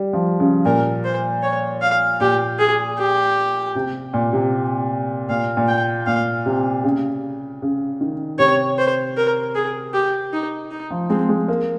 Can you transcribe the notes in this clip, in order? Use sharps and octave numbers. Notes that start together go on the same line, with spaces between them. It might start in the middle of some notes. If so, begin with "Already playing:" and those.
Already playing: G3
F3
C#3
A#2 A#4
C5
C#5
F5
A#2 G4
G#4
G4
C3
A#2
C3
A#2 F5
A#2
G5
A#2 F5
C3
C#3
C#3
D#3
C3 C#5
C5
A#4
G#4
G4
D#4
D#4
F3
G#3 C4
G#3
A#3